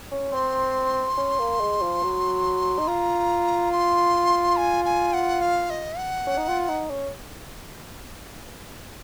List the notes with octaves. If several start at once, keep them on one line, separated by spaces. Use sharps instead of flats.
C#4
C4 C6
C#4
A#3
G#3
F3
F#3
D#4
F4 A#5
C6
G#5
G#5
F#5
F5
D#5
F#5
C#4
D#4
F4
D#4
C#4